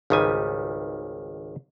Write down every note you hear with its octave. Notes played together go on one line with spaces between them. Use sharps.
G#1 C#2 D#3 G3 G#5